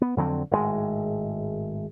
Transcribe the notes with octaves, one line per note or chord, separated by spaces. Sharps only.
B3
F2 D3 F#3 C4
G#1 A2 C#3 G#3